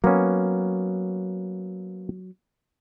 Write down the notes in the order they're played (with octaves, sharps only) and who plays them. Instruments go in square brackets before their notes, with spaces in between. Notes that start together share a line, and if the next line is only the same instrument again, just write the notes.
[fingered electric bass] F#3 [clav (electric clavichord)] A#3 B3 C#4